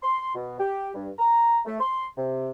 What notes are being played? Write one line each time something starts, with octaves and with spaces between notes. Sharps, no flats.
C6
B2
G4
G2
A#5
A3
C6
C3